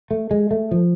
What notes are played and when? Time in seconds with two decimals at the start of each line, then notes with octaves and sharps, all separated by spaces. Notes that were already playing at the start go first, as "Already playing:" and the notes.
0.11 A3
0.31 G#3
0.51 A3
0.71 F3